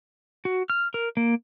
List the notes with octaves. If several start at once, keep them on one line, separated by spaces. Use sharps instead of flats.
F#4
F6
A#4
A#3